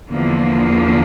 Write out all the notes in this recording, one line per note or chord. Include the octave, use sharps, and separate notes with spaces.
E2 D3 F3 A#3